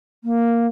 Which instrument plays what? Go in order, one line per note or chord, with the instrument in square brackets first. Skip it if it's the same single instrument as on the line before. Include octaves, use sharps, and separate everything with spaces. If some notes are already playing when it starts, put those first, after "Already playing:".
[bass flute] A#3